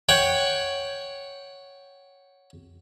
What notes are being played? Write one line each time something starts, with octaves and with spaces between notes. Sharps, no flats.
C#5 F#5 G5